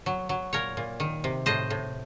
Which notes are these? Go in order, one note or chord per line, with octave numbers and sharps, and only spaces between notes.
F#3
F#3
A#2 A#4 C#5
A#2
D#3
C3
A2 C5 D#5
A2